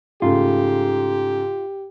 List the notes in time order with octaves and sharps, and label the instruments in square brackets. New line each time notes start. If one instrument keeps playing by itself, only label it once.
[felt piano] G#2 C#3 A3 [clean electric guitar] F4 [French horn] G4